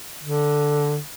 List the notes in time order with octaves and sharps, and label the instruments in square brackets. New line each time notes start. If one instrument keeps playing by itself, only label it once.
[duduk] D3